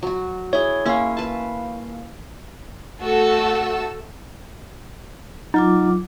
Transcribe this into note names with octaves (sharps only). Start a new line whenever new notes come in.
F#3 F#4
E4 G#4 C#5
A#3 C#4 E4 F5
B4 A5
A3 F#4 A4 E6
F#3 D#4 F4 D6